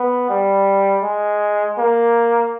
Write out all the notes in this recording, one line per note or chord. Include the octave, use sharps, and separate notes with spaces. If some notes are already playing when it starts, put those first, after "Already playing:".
Already playing: B3
G3
G#3
A#3